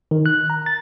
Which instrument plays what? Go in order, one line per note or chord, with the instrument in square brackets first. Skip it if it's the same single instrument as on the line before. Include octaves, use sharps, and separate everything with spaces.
[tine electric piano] D#3
F#6
A#5
A6